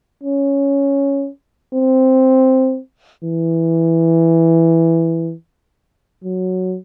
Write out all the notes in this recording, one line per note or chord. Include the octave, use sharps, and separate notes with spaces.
C#4
C4
E3
F#3